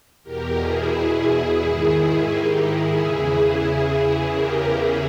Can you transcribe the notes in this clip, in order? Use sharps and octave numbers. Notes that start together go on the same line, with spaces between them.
E2 B2 G4 A#4
E4 G#4
G#2 D#3
D#4 G4
E4 G#4
E2 C#3 E3
E2 C#3 E3 G4 A#4
E4 G#4